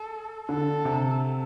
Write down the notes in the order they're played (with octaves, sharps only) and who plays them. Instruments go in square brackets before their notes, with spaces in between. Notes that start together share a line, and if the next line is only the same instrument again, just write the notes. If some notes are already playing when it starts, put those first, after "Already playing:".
Already playing: [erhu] A4
[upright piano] D3 [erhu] A4
[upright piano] C3